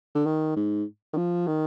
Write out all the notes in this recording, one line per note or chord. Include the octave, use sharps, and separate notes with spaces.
D3
D#3
G#2
D#3
F3
D#3